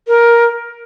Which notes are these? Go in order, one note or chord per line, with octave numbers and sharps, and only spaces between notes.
A#4